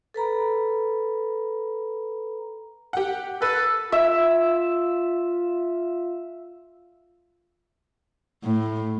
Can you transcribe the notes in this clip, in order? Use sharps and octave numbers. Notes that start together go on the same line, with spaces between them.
A4 B4 A#5 B5
G4 F#5
A4 B4
F4 E5
A2